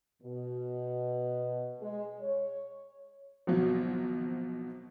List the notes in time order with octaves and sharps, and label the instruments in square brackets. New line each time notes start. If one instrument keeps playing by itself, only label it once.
[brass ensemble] B2
G#3
C#5
[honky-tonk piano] G#1 B2 F3 F#3